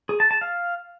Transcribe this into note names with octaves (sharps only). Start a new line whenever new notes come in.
G#4
A5
A5
F5